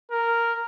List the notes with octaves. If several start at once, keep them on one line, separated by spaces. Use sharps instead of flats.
A#4